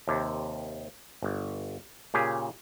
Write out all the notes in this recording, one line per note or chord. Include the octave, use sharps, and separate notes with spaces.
D#2 C3
G1
A#2 C#3 G4 G#4